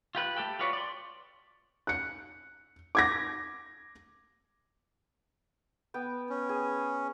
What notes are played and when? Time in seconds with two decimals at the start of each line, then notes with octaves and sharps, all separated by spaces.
0.15 F4 G4 B4 F#6
0.37 A3 G4 A4 G5
0.59 F4 F#4 B4 C#5 D5
0.73 D5 C6
1.87 F#6 C#7
2.95 D6 G#6 A#6
5.94 B3 G5
6.30 C#4
6.49 G#4